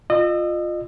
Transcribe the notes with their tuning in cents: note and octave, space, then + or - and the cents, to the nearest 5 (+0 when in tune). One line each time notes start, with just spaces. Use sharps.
F4 +5 D#5 -30 E6 +0